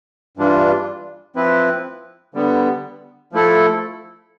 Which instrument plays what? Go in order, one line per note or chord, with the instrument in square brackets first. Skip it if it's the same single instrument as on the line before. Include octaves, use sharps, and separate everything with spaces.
[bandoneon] G2 E3 G3 D4 F4
F3 C4 E4 B4
D3 G3 B3
F3 A3 E4 A4